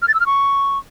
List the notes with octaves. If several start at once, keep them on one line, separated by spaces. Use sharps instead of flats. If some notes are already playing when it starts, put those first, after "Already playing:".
F6
A6
E6
F6
C#6